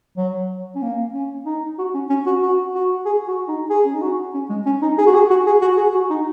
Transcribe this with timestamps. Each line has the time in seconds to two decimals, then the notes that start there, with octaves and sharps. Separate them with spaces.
0.17 F#3
0.76 C#4
0.83 A#3
1.14 C#4
1.46 D#4
1.79 F#4
1.94 C#4
2.09 C#4
2.26 F#4
2.43 F#4
2.75 F#4
3.05 G#4
3.28 F#4
3.48 D#4
3.70 G#4
3.85 C#4
3.94 D#4
4.02 F#4
4.34 C#4
4.50 G#3
4.66 C#4
4.82 D#4
4.98 G#4
5.07 F#4
5.14 G#4
5.30 F#4
5.47 G#4
5.62 F#4
5.77 G#4
5.95 F#4
6.10 D#4